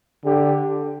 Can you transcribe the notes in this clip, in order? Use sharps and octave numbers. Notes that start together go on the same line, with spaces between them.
D3 G4